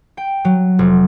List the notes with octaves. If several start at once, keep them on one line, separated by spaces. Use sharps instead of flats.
G5
F#3
F1